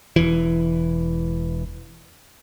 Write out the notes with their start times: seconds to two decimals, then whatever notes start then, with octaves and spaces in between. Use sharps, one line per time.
0.16 E1 E3